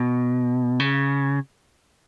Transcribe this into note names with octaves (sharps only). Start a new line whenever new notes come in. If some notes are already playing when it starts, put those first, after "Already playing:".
Already playing: B2
C#3